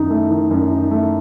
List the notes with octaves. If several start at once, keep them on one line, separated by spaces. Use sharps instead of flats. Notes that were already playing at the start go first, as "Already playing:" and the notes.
Already playing: F#2 D#3 D#4
A3
D#3
F#2
D#4
A3